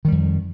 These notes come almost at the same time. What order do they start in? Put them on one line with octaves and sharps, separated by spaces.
D#3 G3 F2